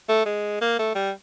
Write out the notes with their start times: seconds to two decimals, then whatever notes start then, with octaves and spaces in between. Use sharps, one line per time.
0.09 A3
0.26 G#3
0.62 A#3
0.79 A3
0.95 G3